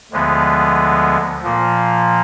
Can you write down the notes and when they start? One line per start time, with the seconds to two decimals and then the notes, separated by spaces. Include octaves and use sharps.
0.11 D2 D3 F3 G#3 B3
1.44 A#2 F3 A#3